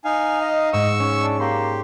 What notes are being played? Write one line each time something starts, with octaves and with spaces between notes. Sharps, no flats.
D#4 F5 G#5
D#5
G#2 C#6 E6
C#4
D4
A#3 G4 C6